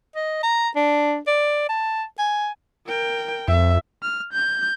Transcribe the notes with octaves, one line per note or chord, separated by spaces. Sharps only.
D#5
A#5
D4
D5
A5
G#5
A#4 G5
F2 E5
F6
G6